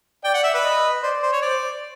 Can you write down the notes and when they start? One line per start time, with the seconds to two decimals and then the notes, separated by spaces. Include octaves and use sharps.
0.24 D5 G5
0.34 F#5
0.44 E5
0.54 B4
0.64 D#5
1.03 C5 D5
1.22 C5
1.32 C#5
1.42 C5 D5